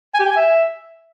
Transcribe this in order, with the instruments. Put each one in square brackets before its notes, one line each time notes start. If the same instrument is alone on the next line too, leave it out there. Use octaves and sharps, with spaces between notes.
[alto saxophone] G#5
G4
G5
G#5
E5